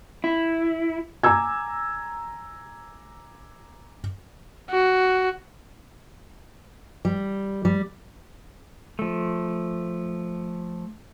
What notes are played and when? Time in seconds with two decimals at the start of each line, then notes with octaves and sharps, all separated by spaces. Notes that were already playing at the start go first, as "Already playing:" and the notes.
0.24 E4
1.23 G#5 A#5 D6 E6 G#6
4.70 F#4
7.05 G3
7.65 G3
8.99 F3 A3